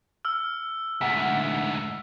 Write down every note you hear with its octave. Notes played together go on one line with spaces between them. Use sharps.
E6 F6
D2 G#2 F#5 B6